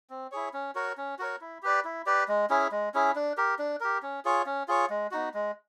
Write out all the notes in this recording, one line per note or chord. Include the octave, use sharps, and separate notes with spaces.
C4
E4 G#4 C#5
C#4
F#4 A#4 C#5
C#4
F#4 A#4 C#5
E4
G4 B4 D5
E4
G4 B4 D5
G#3
C#4 E4 G#4
G#3
C#4 E4 G#4
D4
G4 A#4
D4
G4 A#4
C#4
F4 G#4 C#5
C#4
F4 G#4 C#5
G#3
B3 D#4 F#4
G#3